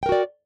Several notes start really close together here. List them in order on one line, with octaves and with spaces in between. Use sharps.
G5 A#4 F#4 D5